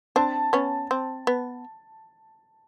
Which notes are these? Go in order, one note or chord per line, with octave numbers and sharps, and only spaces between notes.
C4 D4 A5
B3 C#4
C4
B3